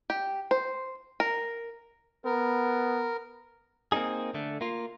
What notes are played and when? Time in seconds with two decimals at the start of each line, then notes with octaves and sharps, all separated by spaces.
0.10 G4
0.51 C5
1.20 A#4
2.25 B3 A#4
3.92 A#3 C4 D4 D#4 G#4
4.34 D3 A3
4.61 A#3 F4